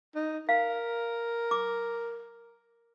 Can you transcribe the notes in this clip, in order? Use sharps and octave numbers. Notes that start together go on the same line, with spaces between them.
D#4
A#4 F5
D6